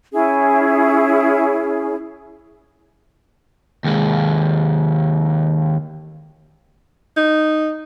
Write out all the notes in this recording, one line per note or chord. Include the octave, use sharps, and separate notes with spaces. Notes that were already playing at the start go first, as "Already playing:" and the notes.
C#4 E4 G#4
D#2 G#3
D#4